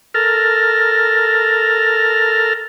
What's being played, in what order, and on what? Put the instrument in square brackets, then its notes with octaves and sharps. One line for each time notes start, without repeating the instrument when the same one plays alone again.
[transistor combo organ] A4 A#4 F6